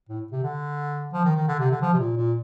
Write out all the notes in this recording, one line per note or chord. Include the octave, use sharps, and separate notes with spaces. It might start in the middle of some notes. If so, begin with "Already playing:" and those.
A2
C3
D3
F3
D#3
D#3
D3
C3
D3
F3
C3
A#2
A#2